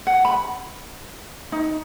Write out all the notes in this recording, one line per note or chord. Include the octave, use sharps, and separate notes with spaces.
F#5
B5
D#4